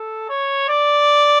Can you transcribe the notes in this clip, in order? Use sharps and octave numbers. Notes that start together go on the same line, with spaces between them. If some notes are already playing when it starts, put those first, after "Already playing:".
Already playing: A4
C#5
D5